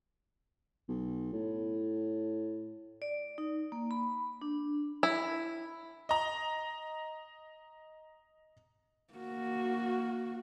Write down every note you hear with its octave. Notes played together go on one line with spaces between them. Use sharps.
B1
A2
D5
D#4
A#3
B5
D4
E4
D#5 A#5
A#3 F#4